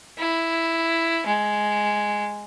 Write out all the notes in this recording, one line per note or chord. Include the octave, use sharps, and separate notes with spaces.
E4
G#3